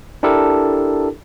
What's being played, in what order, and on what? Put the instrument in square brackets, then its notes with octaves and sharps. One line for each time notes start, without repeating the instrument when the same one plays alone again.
[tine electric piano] D4 E4 G4 A4 A#4